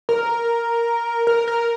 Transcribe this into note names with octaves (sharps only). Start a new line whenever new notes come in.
A#4
A#4
A#4